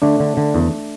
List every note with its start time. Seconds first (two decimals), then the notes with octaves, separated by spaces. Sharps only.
0.02 D3 A3 D4
0.20 D3
0.37 D3
0.54 E2